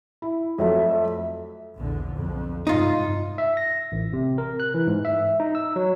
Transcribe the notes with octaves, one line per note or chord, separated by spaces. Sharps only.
E4
F2 F#3 A3 E5
A#1 E2 D3
B1 F2
G#1 G2 C3 D#4 F4
E5
A#6
A1
C3
A#4
F#6
E3
G#2
E5
D#4
E6
F#3